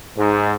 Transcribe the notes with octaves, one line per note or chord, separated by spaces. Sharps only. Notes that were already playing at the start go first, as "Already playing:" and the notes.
G#2